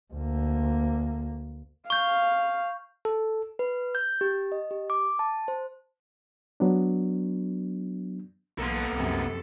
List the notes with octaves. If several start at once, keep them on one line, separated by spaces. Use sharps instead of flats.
D2 A#3
F5 C#6 G6
A4
B4
G6
G4
D#5
G4
D6
A5
C5
F#3 B3 D4
B1 A#3 B3 A4 A#4 C6
C2 F#2 C3